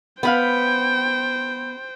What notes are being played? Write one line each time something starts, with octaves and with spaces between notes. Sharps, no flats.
B3 B4 C5 F5 G5